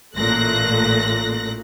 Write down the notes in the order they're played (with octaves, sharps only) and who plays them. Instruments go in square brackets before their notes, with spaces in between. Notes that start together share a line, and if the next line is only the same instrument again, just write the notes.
[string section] A1 A#2 A3 F#6 A#6